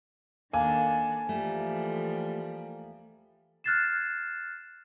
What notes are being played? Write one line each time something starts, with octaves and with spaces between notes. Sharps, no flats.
D#3 A#3 D4 A4 G#5
E3 F3 G3 A3
F6 F#6 G#6 A6 C7 E7